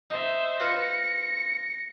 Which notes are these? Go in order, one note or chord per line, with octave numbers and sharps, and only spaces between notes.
D#4 C5 E5
F4 B4 C5 A#6 C#7